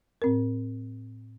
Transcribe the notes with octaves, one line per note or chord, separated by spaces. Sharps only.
A2 C4 A#4